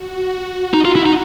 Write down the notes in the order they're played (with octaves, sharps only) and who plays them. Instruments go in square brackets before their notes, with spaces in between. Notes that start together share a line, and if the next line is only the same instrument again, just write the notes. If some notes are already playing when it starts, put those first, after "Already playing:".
Already playing: [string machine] F#4
[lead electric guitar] D#4
F4
E4
D#4